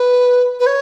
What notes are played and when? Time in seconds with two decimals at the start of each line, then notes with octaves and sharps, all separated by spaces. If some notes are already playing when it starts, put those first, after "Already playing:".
Already playing: B4
0.59 B4
0.66 C#5